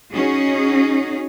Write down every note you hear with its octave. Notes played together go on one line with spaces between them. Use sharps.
C#4 D#4 F#4 G#4